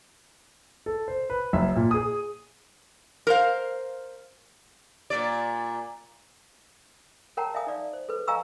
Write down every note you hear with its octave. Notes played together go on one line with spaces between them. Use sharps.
A4
C5
B4
F#1 E5
A#2
G#4 D#6
A#4 C5 F5
A#2 D5
A#4 C#5 F#5 G5 A5 A#5
D5 E5 F5 G#5 D#6
D#4 D5 F5
C5
A4 B4
D#5 F5 G#5 A#5 C#6 E6